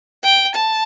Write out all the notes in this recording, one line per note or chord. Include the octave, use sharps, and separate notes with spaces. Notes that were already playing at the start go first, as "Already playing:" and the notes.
G5
A5